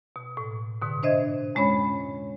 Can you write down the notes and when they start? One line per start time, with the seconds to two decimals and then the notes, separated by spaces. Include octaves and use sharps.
0.16 B2
0.37 A2
0.82 G#2 B2 D3
1.03 D4 C5 D#5 E5 G#6
1.55 F2 G#3 C#4 C#5 B5